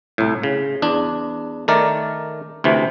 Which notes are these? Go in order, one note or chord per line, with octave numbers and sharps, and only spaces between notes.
C2 A2
C#3
E2 D4
D#3 A3 A#4 D5
D2 C3 E3